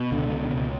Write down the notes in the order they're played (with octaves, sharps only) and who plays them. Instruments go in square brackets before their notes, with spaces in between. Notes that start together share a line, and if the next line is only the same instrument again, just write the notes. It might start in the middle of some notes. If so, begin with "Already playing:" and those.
Already playing: [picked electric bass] B2
C#2 D3
B2
C#2